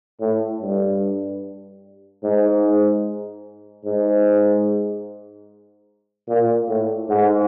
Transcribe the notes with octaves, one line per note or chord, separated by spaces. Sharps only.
A2
G2
G#2
G#2
A#2
A2
G#2